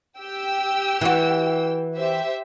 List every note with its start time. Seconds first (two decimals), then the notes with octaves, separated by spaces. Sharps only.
0.20 G4 G5 E6
1.01 E3 F#4
1.96 G4 C5 E5